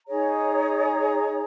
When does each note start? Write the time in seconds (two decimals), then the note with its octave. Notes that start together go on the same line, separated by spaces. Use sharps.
0.07 D#4 G#4 C#5 A#5